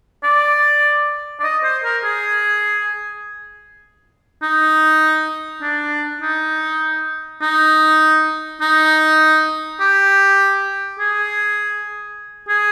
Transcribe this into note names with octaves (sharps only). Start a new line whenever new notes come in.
D5
D5
D#5
C5
A#4
G#4
D#4
D4
D#4
D#4
D#4
G4
G#4
G#4